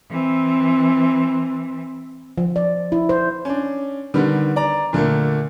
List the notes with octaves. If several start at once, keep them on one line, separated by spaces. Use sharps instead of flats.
E3 C4
F3
D5
E4
C5
C#4 D4
D3 D#3 G3 B3
D5 A#5
A#2 D3 A3 A#3